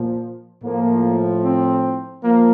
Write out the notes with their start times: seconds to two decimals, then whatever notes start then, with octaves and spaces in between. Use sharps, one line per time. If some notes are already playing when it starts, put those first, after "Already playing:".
Already playing: A#2 F3
0.63 A2 F3 A#3
1.43 C4
2.23 F3 A#3